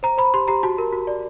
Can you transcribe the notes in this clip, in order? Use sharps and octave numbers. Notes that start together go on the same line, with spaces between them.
C5 A#5
C5 B5
G4 C6
G4 A#5
F#4 A5
A#4
F#4
D5